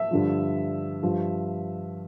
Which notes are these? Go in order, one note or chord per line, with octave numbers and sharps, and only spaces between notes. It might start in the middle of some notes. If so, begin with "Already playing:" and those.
Already playing: E5
G2 D3 F3
G2 F3